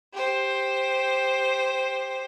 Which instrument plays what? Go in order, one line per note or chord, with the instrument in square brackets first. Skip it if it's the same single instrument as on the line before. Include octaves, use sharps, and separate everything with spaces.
[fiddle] G4 C5